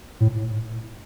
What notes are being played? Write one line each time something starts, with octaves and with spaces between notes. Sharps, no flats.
A2